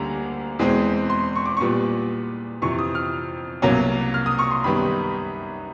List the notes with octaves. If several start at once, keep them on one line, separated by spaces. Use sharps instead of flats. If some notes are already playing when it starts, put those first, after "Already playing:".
Already playing: D2 D3 G3 A#3 C#4 G#5 A#5
E2 B2 G#3 C4
C6
C#6
D6
A#2 G3 B3 C#6
F2 C3 E3 C#6
D#6
F6
C2 B2 F#3 A#3 C#4
F6
D#6
C#6
C6
F#2 D#3 G3 B3 B5